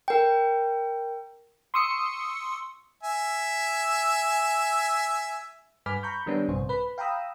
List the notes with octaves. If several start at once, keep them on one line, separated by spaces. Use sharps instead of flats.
A#4 G5
C6 C#6 D#6 E6 C#7
E5 G#5
G2 B4 G#5 D6 F6 B6
A#5 B5 C#6 G6
D#3 G3 B3 C#4 D4
A#1 G2 C3 C5
B4 B5
F5 G5 A#5 B5 D#6 E6